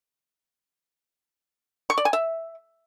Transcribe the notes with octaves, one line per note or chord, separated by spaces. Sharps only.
C#6
D5
G#5
E5